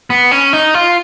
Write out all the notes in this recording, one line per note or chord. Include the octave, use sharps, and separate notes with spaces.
B3
C#4
D#4
F4